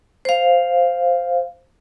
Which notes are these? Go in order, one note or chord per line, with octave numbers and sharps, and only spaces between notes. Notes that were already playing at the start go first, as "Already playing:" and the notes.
C5 F5